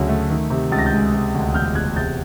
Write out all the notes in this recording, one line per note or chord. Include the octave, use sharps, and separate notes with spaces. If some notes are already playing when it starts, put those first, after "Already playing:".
Already playing: D2 C#3 F#3
A3
D#3
C3
C#2 A6
A#6
G6 A6
G#3
C3
D2
E1 F6 G6
E1 F#6 G#6
C3 G6 A6